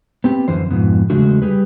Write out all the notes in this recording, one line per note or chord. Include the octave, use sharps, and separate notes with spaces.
B3 C4 G4
F#2 D3 E3 C5
F2 G#2 B2
E2 C#3 G#3 A3 D4 F#4
G3 G4 G#4 B4